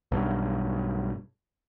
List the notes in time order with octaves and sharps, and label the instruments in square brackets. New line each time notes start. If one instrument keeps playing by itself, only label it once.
[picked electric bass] B1 G2